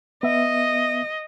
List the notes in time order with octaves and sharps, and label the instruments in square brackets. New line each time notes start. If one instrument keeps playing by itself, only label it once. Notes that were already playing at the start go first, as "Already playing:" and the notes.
[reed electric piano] B3 E5 [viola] D#5